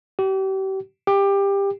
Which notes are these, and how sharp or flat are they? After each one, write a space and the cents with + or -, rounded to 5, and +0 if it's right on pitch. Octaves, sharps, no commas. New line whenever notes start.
G4 -35
G4 +20